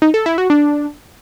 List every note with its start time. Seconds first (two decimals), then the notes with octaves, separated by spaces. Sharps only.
0.02 D#4
0.14 A4
0.26 E4
0.38 F#4
0.50 D4